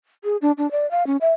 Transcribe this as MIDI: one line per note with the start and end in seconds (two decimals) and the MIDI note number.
0.24 0.37 68
0.42 0.52 62
0.58 0.70 62
0.71 0.89 74
0.91 1.06 77
1.07 1.17 61
1.21 1.33 76